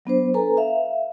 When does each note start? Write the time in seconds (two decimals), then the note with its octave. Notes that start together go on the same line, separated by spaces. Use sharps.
0.05 F#3 B3 D4 C5
0.34 A4 B4 G#5 A#5
0.57 E5 F5